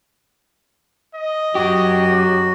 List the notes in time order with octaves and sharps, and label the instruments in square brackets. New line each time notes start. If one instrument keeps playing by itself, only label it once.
[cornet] D#5
[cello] F#2 [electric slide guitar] F#3 G4 [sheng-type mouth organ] F#4